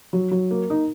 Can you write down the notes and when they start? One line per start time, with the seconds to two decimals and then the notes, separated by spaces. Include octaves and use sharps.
0.13 F#3
0.31 F#3
0.51 A#3
0.70 D#4